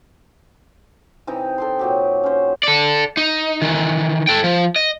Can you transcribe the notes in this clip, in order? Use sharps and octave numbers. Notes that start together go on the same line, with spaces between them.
C3 E3 D#4
A4 G5 C6
A#2 F#3 G4
C#4 C5
A4 D5
D#4
D#3 E3
A4 G5
F3
D#5